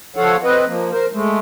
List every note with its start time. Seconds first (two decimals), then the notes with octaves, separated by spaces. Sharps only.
0.16 F3 A4 C#5 F5 F#5
0.44 C4 B4 D#5
0.67 F3 A#3
0.92 A#4 C5
1.13 G#3 A3